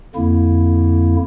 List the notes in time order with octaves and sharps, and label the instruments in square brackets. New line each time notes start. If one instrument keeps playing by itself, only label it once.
[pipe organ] F2 D3 A#3 E4